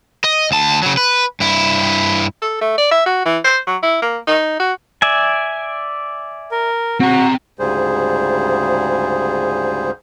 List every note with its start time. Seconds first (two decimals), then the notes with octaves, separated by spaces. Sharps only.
0.24 D#5
0.51 D2 A5
0.83 C#3 F#3
0.97 B4
1.40 G2 E4
2.42 A4
2.61 A3
2.78 D5
2.91 E5
3.06 F#4
3.25 E3
3.44 C5
3.67 F#3
3.83 E4
4.02 A#3
4.27 D#4
4.60 F#4
5.02 D5 E5 G#5
6.51 A#4
7.00 C4 F#4 A#5
7.59 D2 G#2 C#3 G3 G#4 C5